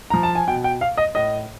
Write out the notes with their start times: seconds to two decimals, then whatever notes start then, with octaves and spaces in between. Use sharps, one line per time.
0.10 F3 A#5
0.23 A5
0.35 G#5
0.48 B2 G5
0.64 G5
0.81 F5
0.98 D#5
1.15 A2 D#5